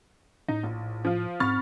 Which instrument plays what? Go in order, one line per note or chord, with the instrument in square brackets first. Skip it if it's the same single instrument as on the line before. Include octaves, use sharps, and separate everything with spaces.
[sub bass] A2 [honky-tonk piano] D#4
[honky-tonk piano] A#1
F3 F4
[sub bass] G#2 [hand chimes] C4 C#6 [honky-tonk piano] B5 F6 A6